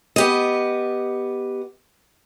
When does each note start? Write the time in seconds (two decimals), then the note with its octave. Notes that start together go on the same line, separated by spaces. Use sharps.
0.16 B3 G4 D#5